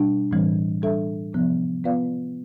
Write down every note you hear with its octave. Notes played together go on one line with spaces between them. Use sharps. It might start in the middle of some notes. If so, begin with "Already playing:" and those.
Already playing: B2 G3 D4
A2 E3 G3 C4
G3 D4 A4 E5
C3 F3 B3
B3 F4 B4 D5 F5